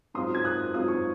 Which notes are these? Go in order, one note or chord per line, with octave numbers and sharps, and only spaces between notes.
G#2 F#3 C4 F4 C6 D#6
G#6
D#6 F#6
G#2 F#3 C4 F4 D#6
C#6